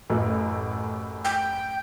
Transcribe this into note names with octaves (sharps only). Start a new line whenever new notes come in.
A1 F#2 A2
G5